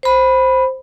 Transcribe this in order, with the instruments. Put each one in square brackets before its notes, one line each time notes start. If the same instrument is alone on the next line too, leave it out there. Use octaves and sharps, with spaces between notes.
[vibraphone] C5 B5